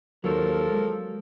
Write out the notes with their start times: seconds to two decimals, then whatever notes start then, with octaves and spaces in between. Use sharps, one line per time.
0.24 D#2 F3 F#3 A4 A#4
0.72 G#3